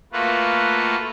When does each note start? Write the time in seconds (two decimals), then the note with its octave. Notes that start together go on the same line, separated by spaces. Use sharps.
0.13 A3 A#3 F4 F#4 B4